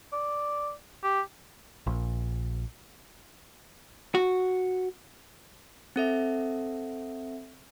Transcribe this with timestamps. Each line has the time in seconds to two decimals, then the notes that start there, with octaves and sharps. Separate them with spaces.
0.13 D5
1.03 G4
1.87 A#1
4.15 F#4
5.96 C4 A4 E5